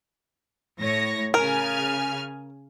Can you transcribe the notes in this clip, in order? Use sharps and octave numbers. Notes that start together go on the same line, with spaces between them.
A2 C#5 A#6
C#3 A#4 G#5 F6